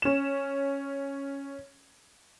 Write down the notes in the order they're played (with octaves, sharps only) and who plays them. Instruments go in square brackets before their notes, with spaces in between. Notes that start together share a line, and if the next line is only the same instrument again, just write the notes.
[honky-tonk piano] C#4 E7